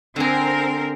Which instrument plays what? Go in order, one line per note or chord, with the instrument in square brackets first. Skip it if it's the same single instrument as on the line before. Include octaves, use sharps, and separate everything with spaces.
[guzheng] D3 G#4 [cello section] C4 A#4